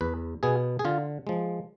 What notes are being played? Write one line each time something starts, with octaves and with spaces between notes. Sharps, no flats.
E2 B4
B2 B3 G#4
G#4
D3 F4
F3 G#3